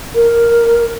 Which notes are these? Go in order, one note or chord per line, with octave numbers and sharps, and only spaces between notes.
A#4